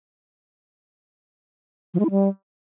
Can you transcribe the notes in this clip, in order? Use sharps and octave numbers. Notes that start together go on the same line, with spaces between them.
F3
G#3
E4
G3